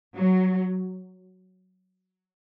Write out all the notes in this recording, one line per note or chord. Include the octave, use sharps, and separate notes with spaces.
F#3